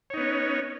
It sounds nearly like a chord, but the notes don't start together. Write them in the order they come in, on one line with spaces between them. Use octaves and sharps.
C#5 D#4 B3 C#4